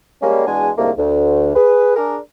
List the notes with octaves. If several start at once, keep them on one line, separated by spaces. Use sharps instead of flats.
G3 G#3 A#3 C#4
E2 G#3 D4 F#4 G#5
C2 G#2 D3 A3 A#3
D2
G#4 B4
D4 G#4 A#4